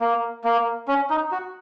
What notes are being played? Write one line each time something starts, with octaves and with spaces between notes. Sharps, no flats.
A#3
A#3
C#4
D#4
F#4